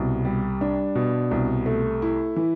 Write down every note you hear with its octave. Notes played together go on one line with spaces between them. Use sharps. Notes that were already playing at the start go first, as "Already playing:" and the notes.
Already playing: C2 B2
G3
D4
B2
C2
A3
E4
E3